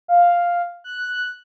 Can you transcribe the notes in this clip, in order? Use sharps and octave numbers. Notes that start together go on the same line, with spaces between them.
F5
F#6